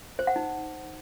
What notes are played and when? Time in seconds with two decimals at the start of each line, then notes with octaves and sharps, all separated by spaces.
0.19 C5
0.27 F#5
0.36 D#4